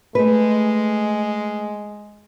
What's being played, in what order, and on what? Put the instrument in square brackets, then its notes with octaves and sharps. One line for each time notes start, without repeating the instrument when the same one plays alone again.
[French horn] G#3 [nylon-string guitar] A3 B4